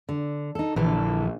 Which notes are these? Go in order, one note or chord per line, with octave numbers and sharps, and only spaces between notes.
D3
D#4 A4
A#1 D3 E3 A4